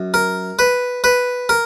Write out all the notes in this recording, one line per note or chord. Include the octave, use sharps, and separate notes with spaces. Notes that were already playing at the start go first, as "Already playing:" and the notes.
Already playing: F#2
A#4
B4
B4
A#4